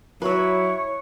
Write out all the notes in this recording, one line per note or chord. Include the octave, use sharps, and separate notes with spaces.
F#3 E4 B4 C#5 E5